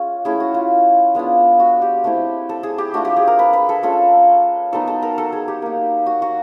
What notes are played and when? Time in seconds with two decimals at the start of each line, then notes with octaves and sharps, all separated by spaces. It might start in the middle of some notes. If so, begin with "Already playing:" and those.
Already playing: G#3 C#4 F4
0.25 A3 C#4 E4 G#4
0.40 F#4
0.54 F4
1.15 G#3 B3 D4 F4
1.60 F#4
1.82 G4
2.04 A3 C4 E4
2.49 A4
2.63 G#4
2.78 G4
2.94 A3 D4 F4 F#4
3.05 G4
3.16 G#4
3.27 A#4
3.39 B4
3.53 B4
3.69 A4
3.83 G#3 C#4 F4 A4
4.73 F#3 B3 D#4 A4
4.87 A4
5.02 A#4
5.18 A4
5.32 G#4
5.48 G4
5.62 A#3 D#4
6.06 F#4
6.22 F#4